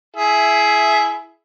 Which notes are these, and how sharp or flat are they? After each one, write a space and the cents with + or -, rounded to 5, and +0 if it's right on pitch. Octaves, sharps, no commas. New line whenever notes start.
E4 +10 G#4 +20 E5 +0